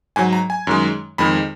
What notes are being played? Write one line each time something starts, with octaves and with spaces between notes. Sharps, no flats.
G#2 F#3 G#5
A#5
G#5
F#2 D#3 G#3
F2 D#3 G#3 B5